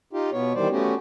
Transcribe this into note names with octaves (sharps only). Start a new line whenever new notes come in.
D#4 F4 G4
B2 B3 C#5
D#3 E3 G3 C5 D5
A3 B3 C#4 F#4 G4